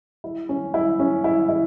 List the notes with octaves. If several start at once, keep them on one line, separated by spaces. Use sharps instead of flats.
E4
C#4
E4
C#4
E4
E4